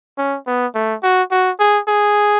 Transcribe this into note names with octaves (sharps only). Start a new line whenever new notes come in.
C#4
B3
A3
F#4
F#4
G#4
G#4